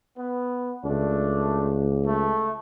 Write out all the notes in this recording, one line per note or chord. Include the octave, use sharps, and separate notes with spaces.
B3
C#2 A3 D4
A3